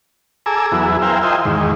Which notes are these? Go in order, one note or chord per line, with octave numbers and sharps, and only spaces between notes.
G#4 A4 G#5 A#5 D6 E6
E2 F#3 B3 E4 G#4
A#4 C5 E5 F5 G5 G#5
F4 C5 D#5 E5 G5 G#5
E2 G#2 D#3